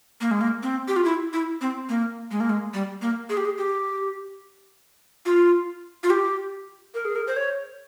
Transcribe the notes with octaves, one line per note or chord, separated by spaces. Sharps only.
A#3
G#3
A#3
C4
G4
F4
E4
E4
C4
A#3
G#3
A#3
G#3
G3
A#3
G#4
G4
G#4
G4
F4
F4
G4
A#4
G#4
A#4
C5
C#5